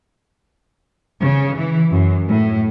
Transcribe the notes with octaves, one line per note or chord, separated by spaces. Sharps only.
C#3
E3
F#2
A2